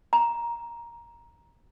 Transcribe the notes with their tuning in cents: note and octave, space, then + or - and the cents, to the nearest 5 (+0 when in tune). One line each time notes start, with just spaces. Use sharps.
A#5 +10